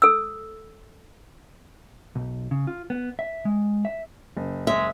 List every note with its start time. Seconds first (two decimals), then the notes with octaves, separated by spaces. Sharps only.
0.02 A4 E6
2.15 B1
2.51 C#3
2.67 F4
2.90 B3
3.19 E5
3.45 G#3
3.85 E5
4.37 F#1
4.67 G#3 E5